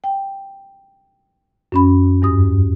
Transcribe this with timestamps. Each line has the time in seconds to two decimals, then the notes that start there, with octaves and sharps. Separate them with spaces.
0.04 G5
1.72 F#2 C#4 B5
2.22 E2 G2 D#6